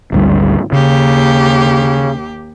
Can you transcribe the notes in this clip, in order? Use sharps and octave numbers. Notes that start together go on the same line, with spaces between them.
G#1 D2 G3
D#2 C#3 G4